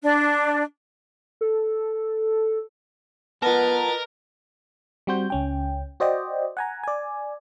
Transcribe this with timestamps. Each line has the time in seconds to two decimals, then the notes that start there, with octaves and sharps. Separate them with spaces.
0.04 D4
1.41 A4
3.42 B3 F4 A#4 B4 D#5 F#5 A5 A6
5.07 G3 C4 F#4 C5 G6
5.30 C#2 C#4 G5
6.00 F#4 C5 D5 D#5 G5
6.57 F#5 G#5 A#5
6.83 D5 G#5